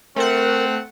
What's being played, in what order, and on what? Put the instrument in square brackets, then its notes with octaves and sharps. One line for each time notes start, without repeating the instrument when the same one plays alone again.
[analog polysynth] A3 F#5 [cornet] C4 [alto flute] A#4